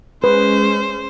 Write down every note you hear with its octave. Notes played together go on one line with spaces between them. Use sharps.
G#3 C#4 B4 C5